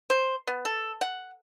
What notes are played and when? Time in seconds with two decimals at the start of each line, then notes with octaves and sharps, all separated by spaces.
0.10 C5
0.47 B3
0.65 A4
1.01 F#5